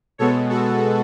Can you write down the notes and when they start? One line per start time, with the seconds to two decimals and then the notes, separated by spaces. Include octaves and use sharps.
0.18 B2 G#3 B3 A4 C#5
0.50 F#4 A4